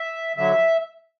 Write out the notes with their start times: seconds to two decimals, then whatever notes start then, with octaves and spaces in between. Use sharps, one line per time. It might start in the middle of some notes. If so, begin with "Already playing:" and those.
Already playing: E5
0.37 D3 F#3 E5